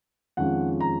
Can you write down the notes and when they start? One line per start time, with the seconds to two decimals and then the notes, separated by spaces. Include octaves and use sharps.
0.37 F2 D#3 G#3 C#4 F4 F#5
0.80 A#5